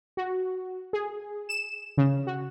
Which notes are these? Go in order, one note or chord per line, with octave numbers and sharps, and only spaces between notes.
F#4
G#4
E7
C#3
F#4